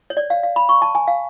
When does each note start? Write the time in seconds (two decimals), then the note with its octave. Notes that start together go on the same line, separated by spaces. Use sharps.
0.10 C#5
0.17 D5
0.30 F5
0.43 F5
0.56 B5
0.69 C#6
0.82 A5
0.95 G#5
1.08 F5